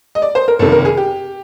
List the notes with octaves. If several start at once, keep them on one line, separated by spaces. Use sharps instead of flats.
D#5
D5
C5
A#4
F#1 F2 C3 D#3 A4
A#4
G#4
G4